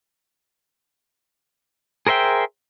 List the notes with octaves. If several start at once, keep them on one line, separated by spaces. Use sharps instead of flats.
G#4 A#4 C5 E5 G5